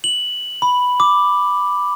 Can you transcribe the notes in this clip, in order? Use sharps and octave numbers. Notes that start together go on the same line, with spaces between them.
F#7
B5
D6